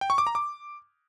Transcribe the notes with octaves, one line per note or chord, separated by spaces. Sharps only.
G5
C#6
D6
A#5
D6